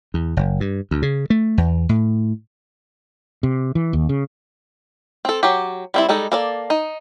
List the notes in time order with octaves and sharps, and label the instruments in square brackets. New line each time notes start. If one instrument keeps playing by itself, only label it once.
[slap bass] E2
F#1
G2
D2
C#3
A3
E2
A2
[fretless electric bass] C3
E3
D#2
C#3
[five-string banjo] C4 A4
F#3 G4
G3 C4 E4
G3 G#3 D#4 A4
A#3 A4 D5
D#4